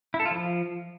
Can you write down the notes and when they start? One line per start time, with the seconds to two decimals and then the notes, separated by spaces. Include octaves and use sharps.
0.14 E4
0.20 A4
0.25 F4
0.31 F3